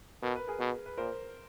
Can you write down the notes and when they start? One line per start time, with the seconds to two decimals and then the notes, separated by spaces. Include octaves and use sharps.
0.23 B2 A#4
0.36 B4
0.48 G#4 A#4
0.60 B2
0.86 B4
0.98 A#2 A#4 C5